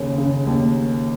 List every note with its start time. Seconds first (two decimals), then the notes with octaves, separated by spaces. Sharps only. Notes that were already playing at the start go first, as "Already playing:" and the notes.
Already playing: D#2 C#3
0.18 C#3
0.47 D#2